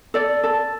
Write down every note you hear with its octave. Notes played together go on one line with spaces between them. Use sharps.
A4 D5
A4